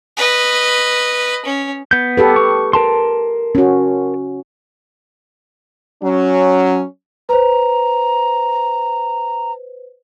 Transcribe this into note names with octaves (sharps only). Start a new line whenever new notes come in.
B4 D#5
C#4
B3 G6
G4 A4 B4
C#6
A#4 A5 C6
C#4 F#4
F#3 C#4
B4 C5 A#5